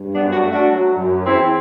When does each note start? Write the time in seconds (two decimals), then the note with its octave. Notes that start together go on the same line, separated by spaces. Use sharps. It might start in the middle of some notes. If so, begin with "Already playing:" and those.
Already playing: G2
0.14 F#2 B3 D4
0.33 D4 F#4
0.43 A3
0.52 D4 F#4
0.71 F#3
0.98 F#2
1.25 E2 C4 E4